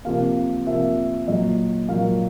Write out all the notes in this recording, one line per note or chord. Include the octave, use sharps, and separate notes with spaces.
C3 F3 A#3 F5
C3 F3 A#3 E5
A#2 F#3 A#3 D#5
A#2 F#3 A#3 F5